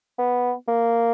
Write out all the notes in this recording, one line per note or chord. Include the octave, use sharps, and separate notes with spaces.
B3
A#3